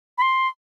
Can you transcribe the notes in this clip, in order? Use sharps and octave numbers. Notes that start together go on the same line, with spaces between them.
B5
C6